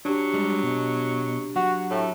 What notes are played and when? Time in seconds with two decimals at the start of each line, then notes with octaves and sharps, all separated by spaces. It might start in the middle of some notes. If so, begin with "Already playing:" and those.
0.05 F#3 D4 G4
0.34 G3 G#3
0.63 B2
1.56 F#3 F#4
1.90 A2 A3